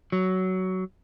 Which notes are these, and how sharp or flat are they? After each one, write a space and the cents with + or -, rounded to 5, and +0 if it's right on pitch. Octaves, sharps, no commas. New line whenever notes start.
F#3 +15